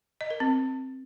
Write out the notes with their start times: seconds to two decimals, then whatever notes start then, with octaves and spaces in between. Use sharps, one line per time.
0.21 D#5
0.30 A#4
0.40 C4